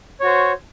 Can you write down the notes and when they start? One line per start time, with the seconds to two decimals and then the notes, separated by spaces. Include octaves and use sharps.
0.20 C#5
0.23 F#4
0.26 C5